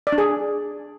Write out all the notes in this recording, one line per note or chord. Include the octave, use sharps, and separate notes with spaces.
D5
D4
G#4